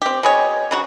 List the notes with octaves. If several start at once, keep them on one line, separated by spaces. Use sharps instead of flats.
C4 G4
B2 G#4 C#5
C#3 F#3 F#4